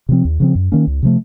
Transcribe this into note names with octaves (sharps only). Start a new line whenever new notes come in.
C3 F3 C4
D#2
C#3 F3 C4
F#2
D#3 A#3 C#4
C#2
C3 F3 A3